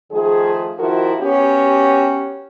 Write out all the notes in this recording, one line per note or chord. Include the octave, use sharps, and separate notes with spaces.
D#3 F3 A3 G#4
D#3 F3 E4 F#4 A#4
B3 C#4 F#4 G4